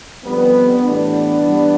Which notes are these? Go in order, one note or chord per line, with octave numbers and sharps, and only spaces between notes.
F2 D3 G3 B3
A2 E3 G3 B3 D4
G2 E3 G3